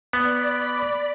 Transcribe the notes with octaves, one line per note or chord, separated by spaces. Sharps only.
B3 D5 B5